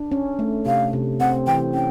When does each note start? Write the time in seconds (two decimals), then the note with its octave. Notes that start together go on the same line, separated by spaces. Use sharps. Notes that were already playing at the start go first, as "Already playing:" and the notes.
Already playing: D4
0.11 C#4
0.39 A3
0.66 C3 F5
0.93 C3
1.20 C4 F#5
1.47 E3 G5
1.74 C#4 G5